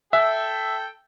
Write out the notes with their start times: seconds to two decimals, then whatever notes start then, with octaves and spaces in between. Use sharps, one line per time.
0.13 A4 E5 G5